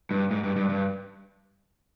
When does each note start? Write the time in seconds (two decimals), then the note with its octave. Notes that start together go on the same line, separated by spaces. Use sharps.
0.11 G2
0.31 G#2
0.43 G2
0.56 G2
0.69 G2